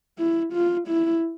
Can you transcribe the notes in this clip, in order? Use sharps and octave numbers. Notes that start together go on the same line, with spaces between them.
E4
F4
E4